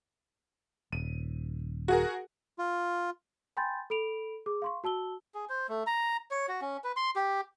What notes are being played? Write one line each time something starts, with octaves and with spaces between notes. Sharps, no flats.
D#1 D#7
F#4 G#4 A#4
F4
G5 G#5 B5 C6 G6 A6
A4 B5 D7 F7
G#4 D6
F5 C6 C#6
F#4 A5 E6 G7
G#4
C5
A3
A#5
C#5
F#4
C#4
B4
C6
G4